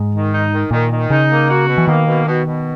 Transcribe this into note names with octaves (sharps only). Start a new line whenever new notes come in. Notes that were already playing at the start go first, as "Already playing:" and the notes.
Already playing: G#2
D#3
D#4
D#3
A#2 D#3
D#3
C#3 D#4
A#3
F#4
B2
E3
D#3 A#3
B2
B2
B2